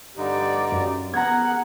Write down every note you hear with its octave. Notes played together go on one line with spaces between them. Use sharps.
G2 D3 D#4 G4 D5
F#2
B3 G#4 A#4 F#5 A#5 G#6